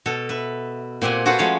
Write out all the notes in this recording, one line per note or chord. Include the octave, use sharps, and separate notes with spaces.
B2 A4
B4 E5
A#2 C4 G4 F#5 G#5
F4 F#4 A4 B4 C5 F#5
F3 G#3 A3 C#4 C#5 F5